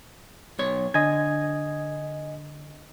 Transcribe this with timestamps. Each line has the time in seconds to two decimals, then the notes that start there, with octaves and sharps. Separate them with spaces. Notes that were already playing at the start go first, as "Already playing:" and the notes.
0.58 B1 C#5
0.94 D3 D#5 G#5 G#6